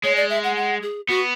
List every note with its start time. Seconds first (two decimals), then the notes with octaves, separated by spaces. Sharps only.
0.04 G#3 C#5
0.17 D5
0.30 E5
0.44 F#5
0.56 F#5
0.83 G#4
1.08 B3 F#4